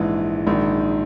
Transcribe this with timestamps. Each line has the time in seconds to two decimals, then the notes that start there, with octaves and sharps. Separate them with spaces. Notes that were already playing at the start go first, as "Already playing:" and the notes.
Already playing: A#1 G#2 E3 G#3
0.47 A#1 G#2 D#3